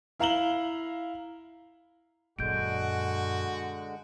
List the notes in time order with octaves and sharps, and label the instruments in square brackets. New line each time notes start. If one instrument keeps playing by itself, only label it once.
[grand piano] E4 F5 A#5 E7 F#7 G7
[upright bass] A#1 F#2 [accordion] D3 G#3 [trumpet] F#4 [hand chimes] G6 D7